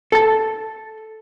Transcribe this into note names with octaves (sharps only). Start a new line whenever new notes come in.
A4 A5